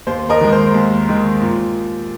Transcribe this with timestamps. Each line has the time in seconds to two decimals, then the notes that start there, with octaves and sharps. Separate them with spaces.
0.07 D#2 C5
0.29 A#4 D#5
0.41 D#3 G#3
0.52 C5
0.74 D#2
1.09 D#3 G#3
1.42 A#2